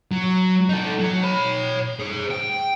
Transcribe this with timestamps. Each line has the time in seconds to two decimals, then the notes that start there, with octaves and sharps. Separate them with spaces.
0.12 F#3
0.69 D#4 A4
0.99 F#3
1.23 C#5 B5
2.00 G#4 C5
2.31 G5